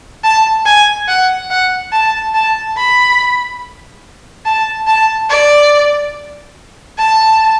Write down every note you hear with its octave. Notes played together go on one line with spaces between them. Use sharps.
A5
G#5
F#5
F#5
A5
A5
B5
A5
A5
D5
A5